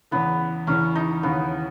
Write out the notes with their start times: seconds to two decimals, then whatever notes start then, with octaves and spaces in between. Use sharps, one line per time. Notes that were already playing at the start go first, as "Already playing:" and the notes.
0.11 E2 C#3 E3 B3
0.67 E2 C#3 E3 C#4
0.95 D#4
1.23 D#2 C#3 E3 B3